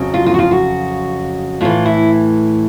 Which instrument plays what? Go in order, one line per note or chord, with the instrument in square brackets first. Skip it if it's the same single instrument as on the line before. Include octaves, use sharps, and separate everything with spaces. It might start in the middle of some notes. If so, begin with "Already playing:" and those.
Already playing: [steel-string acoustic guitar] F2 C#3 F#3
F4
F4
F#4
F4
F#4
A2 E3 F4
E4